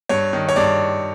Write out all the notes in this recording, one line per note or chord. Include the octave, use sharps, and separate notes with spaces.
G2 C#5
D#3
C#5
G2 D5